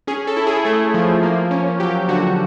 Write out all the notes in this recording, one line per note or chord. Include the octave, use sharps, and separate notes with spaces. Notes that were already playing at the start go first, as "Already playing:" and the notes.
C#4 G#4
A4
E4
G#4
A3
F3
A#3
C#4
F#3 G4
D3 F#4